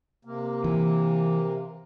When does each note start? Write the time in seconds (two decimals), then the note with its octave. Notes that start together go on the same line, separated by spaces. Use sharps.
0.25 C3 A#3
0.64 E3